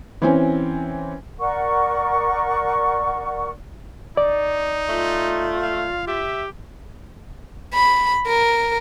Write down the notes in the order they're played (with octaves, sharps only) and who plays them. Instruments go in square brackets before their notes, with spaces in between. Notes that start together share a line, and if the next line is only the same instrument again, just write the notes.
[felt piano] E3 C4 C#4
[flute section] A#4 D5 F#5 C#6
[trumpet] D#4 [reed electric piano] D5
[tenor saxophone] A3 [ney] F4
[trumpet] F5
[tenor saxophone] G4 [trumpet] E5
[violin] B5
A#4